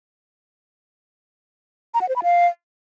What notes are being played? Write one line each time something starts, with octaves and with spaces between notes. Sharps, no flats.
A#5
F#5
C5
B5
F5